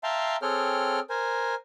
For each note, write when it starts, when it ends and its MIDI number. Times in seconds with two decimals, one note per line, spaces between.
0.03 0.36 76
0.03 0.36 77
0.03 0.36 79
0.03 0.36 81
0.03 0.36 82
0.03 0.36 84
0.42 1.00 60
0.42 1.00 68
0.42 1.00 69
0.42 1.00 73
0.42 1.00 79
0.42 1.00 89
1.10 1.55 70
1.10 1.55 72
1.10 1.55 80